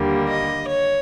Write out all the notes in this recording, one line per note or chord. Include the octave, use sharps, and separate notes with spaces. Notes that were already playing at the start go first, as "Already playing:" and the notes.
Already playing: D#2 D3 G3 A#3
D#5
C#5